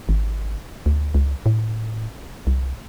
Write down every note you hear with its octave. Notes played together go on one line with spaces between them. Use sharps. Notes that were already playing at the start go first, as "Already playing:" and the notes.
G#1
D2
C#2
A2
C2